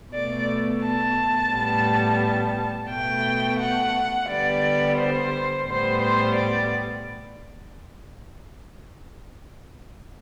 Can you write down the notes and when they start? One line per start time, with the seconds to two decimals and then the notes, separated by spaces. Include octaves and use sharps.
0.13 B2 A3 D5
0.82 A5
1.51 A2 G3 B3
2.90 B2 A3 G5
3.59 F#5
4.28 D3 G3 B3 D5
4.97 C5
5.66 A2 G3 B3 C5
6.01 C5
6.35 D5